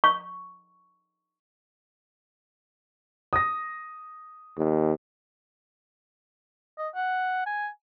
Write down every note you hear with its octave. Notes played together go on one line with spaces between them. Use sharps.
C#6
D#6 A#6
D#2
D#5
F#5
G#5